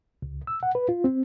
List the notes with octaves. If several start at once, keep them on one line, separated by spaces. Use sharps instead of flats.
C#2
E6
F#5
B4
F4
C4